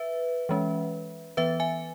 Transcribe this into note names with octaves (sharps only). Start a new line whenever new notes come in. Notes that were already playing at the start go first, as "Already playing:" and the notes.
Already playing: B4 E5
E3 G#3 C#4
E3 B3 B4 E5
E5 G#5